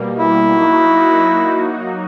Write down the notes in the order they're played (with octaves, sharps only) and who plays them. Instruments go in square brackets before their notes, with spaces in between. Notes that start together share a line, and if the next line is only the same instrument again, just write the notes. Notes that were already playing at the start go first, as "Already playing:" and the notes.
Already playing: [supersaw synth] B2 G3 A#3
[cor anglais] E4
[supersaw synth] F#3 A#3 D#4 F#4